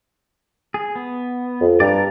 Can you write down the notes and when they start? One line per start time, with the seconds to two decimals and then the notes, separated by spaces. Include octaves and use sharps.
0.74 G#4
0.96 B3
1.61 F2
1.80 G2 D5 A#5